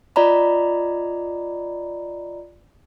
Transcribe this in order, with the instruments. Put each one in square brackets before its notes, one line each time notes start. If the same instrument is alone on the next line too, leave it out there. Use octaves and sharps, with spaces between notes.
[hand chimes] F4 D5 D#5 A#5 B5